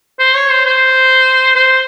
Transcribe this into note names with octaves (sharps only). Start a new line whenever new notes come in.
C5
C#5
C5
C5
C5